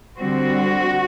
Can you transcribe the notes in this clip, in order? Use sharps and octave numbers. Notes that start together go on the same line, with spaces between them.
D3 G3 C4 F#4